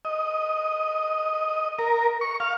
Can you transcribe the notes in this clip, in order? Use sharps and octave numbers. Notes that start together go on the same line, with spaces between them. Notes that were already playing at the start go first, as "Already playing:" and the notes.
D#5
A#4
C#6
F5